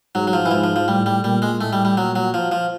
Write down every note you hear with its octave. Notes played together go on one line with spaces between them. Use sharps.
G#2 F#3
F#3
F3
E3
G#2 F3
F3
F3
A2 G3
G3
A#2 G3
G#3
A2 A3
G3
G3
A#2 F#3
F#3
F3
F3